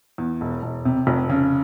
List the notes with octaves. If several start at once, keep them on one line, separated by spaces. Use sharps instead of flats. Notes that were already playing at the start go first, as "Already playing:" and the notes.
E2
E1
E1
C3
F1
C#3